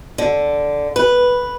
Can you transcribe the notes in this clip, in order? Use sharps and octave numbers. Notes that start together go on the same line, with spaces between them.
D3
B4